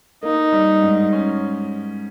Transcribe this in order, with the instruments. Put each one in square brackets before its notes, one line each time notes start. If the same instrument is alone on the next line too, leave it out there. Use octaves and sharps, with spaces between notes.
[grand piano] A#3 [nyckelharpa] D#4
[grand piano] G3
G#2
C#4